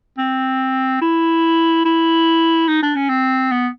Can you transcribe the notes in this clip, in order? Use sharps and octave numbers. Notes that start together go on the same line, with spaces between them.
C4
E4
E4
D#4
D4
C#4
C4
B3